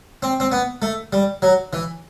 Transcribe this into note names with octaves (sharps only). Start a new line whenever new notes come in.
C4
C4
B3
A3
G3
F#3
E3